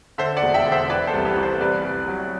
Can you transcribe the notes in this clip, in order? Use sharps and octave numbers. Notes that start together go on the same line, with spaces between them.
D3 C5 E5
D5 F#5
E1
E5 G5
D3 F#5
C5 E5
E3 B4 D5
A4 C5
C2
G4 B4
E3
A4 C5
C2 B4 D5
C2
F#3